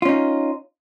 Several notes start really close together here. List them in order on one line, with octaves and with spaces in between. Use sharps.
F4 C#4 D#4